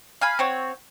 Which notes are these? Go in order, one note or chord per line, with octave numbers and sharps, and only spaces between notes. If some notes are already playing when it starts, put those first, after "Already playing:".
F5 G#5 B5
C4 F#4 C#5